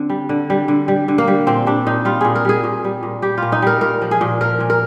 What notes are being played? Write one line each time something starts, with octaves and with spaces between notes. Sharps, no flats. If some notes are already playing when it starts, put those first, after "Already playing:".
Already playing: D3 C4
G3
D3
G3
D3
G3
D3
A#3
G3
A#2 C4
G3 D4
A#2 D#4
G3 F4
A#2 G#4
A#4
G3 G#4
A#2
G3
A#2
G3 G4
A#2 F4
D#4
G3 A#4
A#2 A#4
F3
G#4
A#2
F3 A#4
A#2
A#4